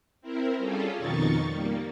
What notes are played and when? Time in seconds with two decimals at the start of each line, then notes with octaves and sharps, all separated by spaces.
0.22 C4 E4 A#4
0.58 G3 C#4 F4 G#4 A4
0.98 F2 B2 D#3 D#4 C#6 A6
1.48 G3 A#3